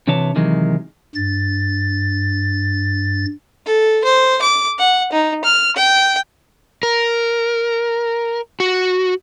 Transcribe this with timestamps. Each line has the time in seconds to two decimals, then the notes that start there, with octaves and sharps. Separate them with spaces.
0.07 C3 E3 D4 B4 C#5 A5
0.36 C3 D#3 E3 F#3 G#3
1.15 G2 A6
3.67 A4
4.04 C5
4.42 D6
4.79 F#5
5.12 D#4
5.44 F6
5.77 G5
6.83 A#4
8.60 F#4